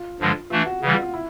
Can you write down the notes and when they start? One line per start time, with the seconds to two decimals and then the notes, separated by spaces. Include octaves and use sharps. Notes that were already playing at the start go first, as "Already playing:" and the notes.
Already playing: F4
0.20 G2 D3 F3 G#3
0.50 E3 A3 D4 F4
0.66 F#4
0.82 C#3 F#4
0.85 E3 G3
0.92 F4
1.02 F4
1.14 E4